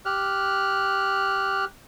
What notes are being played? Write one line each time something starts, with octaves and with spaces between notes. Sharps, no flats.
G4 F6 F#6